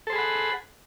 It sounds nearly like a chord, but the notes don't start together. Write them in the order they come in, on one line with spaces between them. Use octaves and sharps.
A4 C5 G#4 B5 F#5